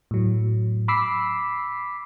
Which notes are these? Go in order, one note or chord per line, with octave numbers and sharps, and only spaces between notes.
A2 F#3
B5 D6 E6 B6 C7